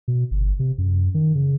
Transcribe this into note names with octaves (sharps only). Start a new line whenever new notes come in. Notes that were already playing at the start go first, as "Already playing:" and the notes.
B2
G1
C3
F#2
D#3
C#3